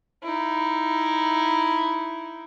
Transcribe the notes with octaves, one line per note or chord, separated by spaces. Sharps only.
D#4 E4